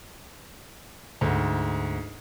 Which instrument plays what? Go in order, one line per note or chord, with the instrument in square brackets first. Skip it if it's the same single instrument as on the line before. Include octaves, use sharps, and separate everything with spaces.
[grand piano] D2 G#2